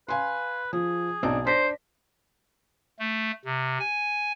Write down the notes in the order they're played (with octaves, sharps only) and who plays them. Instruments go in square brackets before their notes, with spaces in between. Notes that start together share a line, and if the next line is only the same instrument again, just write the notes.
[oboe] B4 [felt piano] F5 G#5 C6
[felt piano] F3 [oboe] G#4
[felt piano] B1 A5 [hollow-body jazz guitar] C4 D4 D#4
[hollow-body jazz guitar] D4 [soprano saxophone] C5 [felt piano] A#6 B6
[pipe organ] A3
C3
G#5